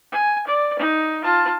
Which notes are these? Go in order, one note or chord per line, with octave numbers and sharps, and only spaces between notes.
G#5
D5
D#4
F4 A5